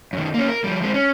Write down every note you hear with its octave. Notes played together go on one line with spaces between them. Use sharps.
F#2 D#3
A#3 C#4
A#4
F3 G3
G#3 C4
C#4